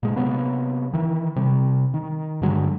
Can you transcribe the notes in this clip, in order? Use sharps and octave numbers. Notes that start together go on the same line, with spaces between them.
A#2 G#3
C3 F#3 A#3 B3
D#3 E3
C3 G3
D#3
G2 D3 F#3 G#3